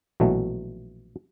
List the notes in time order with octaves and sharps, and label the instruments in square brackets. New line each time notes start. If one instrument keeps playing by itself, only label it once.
[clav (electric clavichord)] A#1 B2 E3 F#3 A3